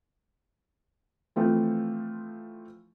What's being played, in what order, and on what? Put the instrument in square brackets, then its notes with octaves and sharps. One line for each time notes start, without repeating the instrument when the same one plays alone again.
[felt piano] E3 F3 A3 C4